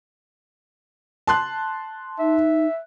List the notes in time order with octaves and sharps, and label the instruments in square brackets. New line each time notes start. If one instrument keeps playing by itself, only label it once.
[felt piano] A5 C6 F#6
[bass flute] D#4 [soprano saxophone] E5